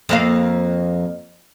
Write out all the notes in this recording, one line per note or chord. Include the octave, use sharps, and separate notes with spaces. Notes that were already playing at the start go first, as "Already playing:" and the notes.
F2 A#3 F5